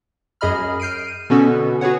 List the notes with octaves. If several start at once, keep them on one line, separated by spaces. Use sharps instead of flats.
F#2 G#4 D#5 B5 F6
F6 G6 C7 D7 D#7
D#7
B2 D3 B3 C#4 F#4 A4
F#4 G#4 B4 C#5 F#5